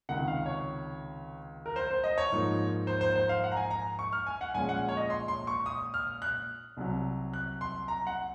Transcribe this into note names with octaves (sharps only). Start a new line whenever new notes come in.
C#2 C3 D#3 F#5
F5
C#5
A#4
C5
C5
D#5
C#5
G#2 F3 A#3 D#4
C5
C5
C5
F5
F#5
A#5
G#5
A#5
C#6
F6
G#5
F#5
A#1 A#2 G#3 C#4 G#5
F#5
C#5
D#5
C6
C6
C#6
D#6
F6
F#6
C2 C3 F#3
F#6
C6
A#5
F#5